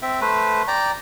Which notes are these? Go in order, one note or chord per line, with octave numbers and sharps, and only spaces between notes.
C4 E5
A3 B4 C5
D5 G5 A#5